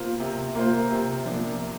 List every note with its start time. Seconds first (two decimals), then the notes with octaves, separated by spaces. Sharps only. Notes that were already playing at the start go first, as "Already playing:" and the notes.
Already playing: C3 A#3 F4 C5
0.20 C3
0.55 A#3 F4 C5
0.91 C3
1.26 F3 A#3 D4
1.61 C3